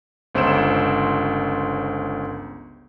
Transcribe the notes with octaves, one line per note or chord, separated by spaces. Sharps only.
G1 C#2 C5 E6 D7 E7